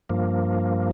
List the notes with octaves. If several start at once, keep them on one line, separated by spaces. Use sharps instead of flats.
G2 F3 A#3